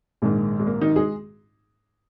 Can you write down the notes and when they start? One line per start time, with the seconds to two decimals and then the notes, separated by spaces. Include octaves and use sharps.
0.22 A#1 G#2 D#3 G#3
0.60 G#3
0.67 A#3
0.81 D#3 D#4
0.96 G#3 G#4